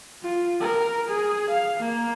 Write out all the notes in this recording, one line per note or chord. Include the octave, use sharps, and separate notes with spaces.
F4
A#4
G#4
F5
A#3